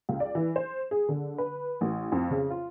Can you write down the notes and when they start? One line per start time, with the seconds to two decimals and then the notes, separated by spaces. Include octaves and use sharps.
0.09 C#2
0.20 D5
0.35 E3
0.56 C5
0.91 G#4
1.09 D3
1.38 B4
1.81 A1
2.12 F2
2.30 C#3
2.50 F4